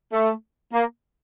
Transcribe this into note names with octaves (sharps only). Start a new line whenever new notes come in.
A3
A#3